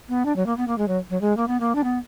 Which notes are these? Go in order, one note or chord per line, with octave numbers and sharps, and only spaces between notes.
B3
D4
F#3
A#3
B3
A#3
G#3
F#3
F#3
G#3
A#3
B3
A#3
D4
B3